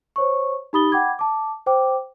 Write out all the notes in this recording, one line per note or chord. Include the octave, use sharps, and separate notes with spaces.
C5 C#5 C#6
D#4 G4 B5 D#6 A6 G7
F#5 G5 B5 D6 G#6
A5 D6
C5 G5 D6